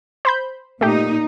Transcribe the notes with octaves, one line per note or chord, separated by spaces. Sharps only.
C5 B5 G6
A#2 A3 D#4 G4